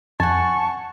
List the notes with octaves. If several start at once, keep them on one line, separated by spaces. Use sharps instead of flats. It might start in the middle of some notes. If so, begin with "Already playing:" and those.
F2 F#5 G#5 A5 C#6